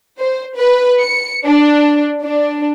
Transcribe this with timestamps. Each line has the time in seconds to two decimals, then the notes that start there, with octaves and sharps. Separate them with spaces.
0.20 C5
0.56 B4
1.01 C#7
1.45 D4
2.22 D4